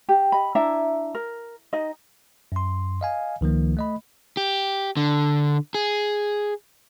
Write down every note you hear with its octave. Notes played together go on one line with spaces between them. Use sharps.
G4
D#5 B5
D4 E4 E5 A#5
A#4
D#4 D#5
F#2 C6
D#5 F5 G#5
C#2 D#3 F3 A#3
A3 D#5 B5
G4
D3
G#4